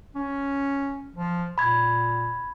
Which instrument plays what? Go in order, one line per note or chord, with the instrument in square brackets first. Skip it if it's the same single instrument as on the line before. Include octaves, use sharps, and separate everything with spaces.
[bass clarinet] C#4
F3
[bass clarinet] A#2 [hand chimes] B5 G#6